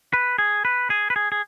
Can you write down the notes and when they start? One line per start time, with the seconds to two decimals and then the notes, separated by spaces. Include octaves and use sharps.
0.13 B4
0.38 G#4
0.65 B4
0.90 G#4
1.10 B4
1.16 G#4
1.32 G#4